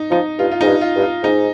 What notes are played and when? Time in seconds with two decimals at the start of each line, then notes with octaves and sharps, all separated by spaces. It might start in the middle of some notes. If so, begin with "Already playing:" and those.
Already playing: D#4
0.11 F3 D#4
0.39 G2 F4
0.51 F4
0.61 G#2 D#4
0.67 G2
0.81 F4
0.96 G2
1.02 F4
1.23 G#2 D#4